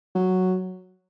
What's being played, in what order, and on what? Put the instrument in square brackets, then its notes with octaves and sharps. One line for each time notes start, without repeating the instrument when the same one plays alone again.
[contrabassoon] F#3